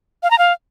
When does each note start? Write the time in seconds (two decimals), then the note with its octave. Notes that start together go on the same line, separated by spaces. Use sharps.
0.23 F5
0.31 A#5
0.38 F5